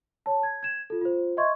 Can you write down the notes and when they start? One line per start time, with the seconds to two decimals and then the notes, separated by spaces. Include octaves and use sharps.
0.26 C#5 A5
0.43 G#6
0.63 G#6 E7
0.90 F4 A4
1.01 F4 C5
1.37 D#5 E5 C6 C#6 G#6